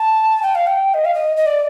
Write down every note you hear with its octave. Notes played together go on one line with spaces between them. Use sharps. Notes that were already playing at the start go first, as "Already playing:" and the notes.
Already playing: A5
G5
F5
G5
D#5
F5
D#5
D#5
D5